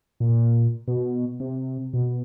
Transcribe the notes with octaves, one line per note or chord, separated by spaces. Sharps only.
A#2
B2
C3
B2